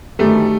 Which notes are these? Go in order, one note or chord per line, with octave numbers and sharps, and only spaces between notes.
G1 F#2 D#3 G3 A3